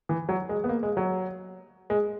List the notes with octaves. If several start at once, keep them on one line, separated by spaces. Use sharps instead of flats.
E3
F#3
G#3
B3
A#3
G#3
F#3
G#3